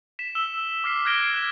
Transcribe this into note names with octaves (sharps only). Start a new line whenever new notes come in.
B6 E7
E6 E7 G7
D6 F6 B6 C7
F6 F#6 G#6 A#6 D7 G7
F#6 E7